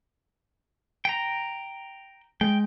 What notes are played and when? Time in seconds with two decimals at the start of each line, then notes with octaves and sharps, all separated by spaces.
1.05 G5 A#5
2.41 G#3 G5